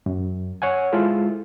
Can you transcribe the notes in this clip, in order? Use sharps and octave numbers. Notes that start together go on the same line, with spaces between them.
F#2
C#5 F#5 G#5
G#3 E4 F4 A4 C5